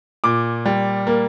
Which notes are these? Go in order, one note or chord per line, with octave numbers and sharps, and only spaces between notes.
A#2 D6
G3
A#3